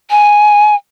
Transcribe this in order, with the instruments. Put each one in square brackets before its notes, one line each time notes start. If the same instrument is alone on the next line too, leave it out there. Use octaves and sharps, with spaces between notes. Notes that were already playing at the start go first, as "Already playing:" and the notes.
[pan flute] G#5